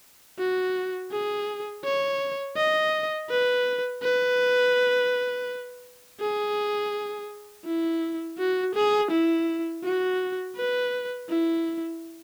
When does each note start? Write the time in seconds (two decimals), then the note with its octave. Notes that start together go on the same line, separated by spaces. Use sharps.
0.39 F#4
1.12 G#4
1.85 C#5
2.57 D#5
3.30 B4
4.03 B4
6.21 G#4
7.66 E4
8.38 F#4
8.75 G#4
9.11 E4
9.84 F#4
10.57 B4
11.30 E4